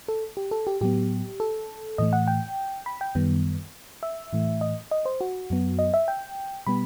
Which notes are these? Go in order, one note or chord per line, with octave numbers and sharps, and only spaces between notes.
A4
G4
A4
G4
A2 F#3 B3 G4
A4
A2 E3 A3 D#5
F#5
G5
B5
G5
F#2 D#3 G3 B3
E5
A2 E3 A3
D#5
D#5
C5
F#4
F#2 F#3 B3
D#5
E5
G5
B2 G3 B3 B5